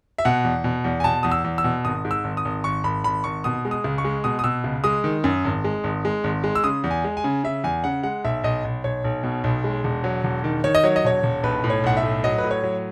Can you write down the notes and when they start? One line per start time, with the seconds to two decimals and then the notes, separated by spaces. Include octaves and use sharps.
0.18 E5
0.25 B2 F#5
0.44 E2
0.64 B2
0.85 E2
1.00 G#5
1.04 B2 A5
1.23 E2 D#6
1.31 E6
1.44 E2
1.58 E6
1.64 B2
1.85 G#1 D#6
2.05 G#2
2.11 E6
2.24 G#1
2.37 D#6
2.45 G#1
2.64 G#1 C#6
2.84 G#1 B5
3.04 G#1 B5
3.24 G#1 C#6
3.44 B2 D#6
3.65 G#3
3.71 D#6
3.84 C#2
3.98 C#6
4.04 G#3
4.24 B2 D#6
4.39 D#6
4.44 B2 E6
4.64 C#2
4.84 G#3 D#6
5.04 D#3
5.24 F#2
5.45 G#1
5.64 G#3
5.84 G#1
6.05 G#3
6.24 G#1
6.44 G#3
6.55 E6
6.64 C#3 D#6
6.84 E2
6.91 G#5
7.04 G#3
7.17 G#5
7.24 C#3
7.44 C#3 E5
7.64 E2 G#5
7.84 C#3 F#5
8.03 G#3 F#5
8.24 B1 E5
8.44 B1 D#5
8.65 B1
8.84 B1 C#5
9.04 B1
9.23 B2
9.44 B1
9.64 G#3
9.84 E1
10.04 F#3
10.24 E1
10.44 D#3
10.64 D#3 C#5
10.75 D#5
10.84 F#3 C#5
10.96 D#5
11.04 E1 C#5
11.23 E1
11.43 B1 B4
11.64 A2
11.70 C#5
11.84 B1 F#5
11.97 E5
12.03 A2
12.24 F#3 D#5
12.38 A2 B4
12.51 C#5
12.64 F#3